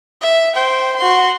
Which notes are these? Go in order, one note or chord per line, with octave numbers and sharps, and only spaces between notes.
E5
C5 G5
F#4 C6